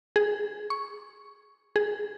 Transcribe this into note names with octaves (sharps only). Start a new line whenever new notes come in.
G#4
C#6
G#4